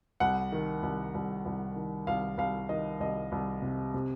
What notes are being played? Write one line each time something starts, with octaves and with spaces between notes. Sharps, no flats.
C2 F#5
D#3
C2
C2
C2
D#3
C2 F5
C2 F5
D#3 D#5
C2 D#5
C2
C3
C3